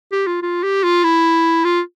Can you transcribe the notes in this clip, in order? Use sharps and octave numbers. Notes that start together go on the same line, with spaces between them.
G4
F4
F4
G4
F4
E4
F4